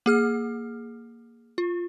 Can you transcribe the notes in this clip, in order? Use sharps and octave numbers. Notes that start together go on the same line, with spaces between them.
A#3 G#4 F6
F4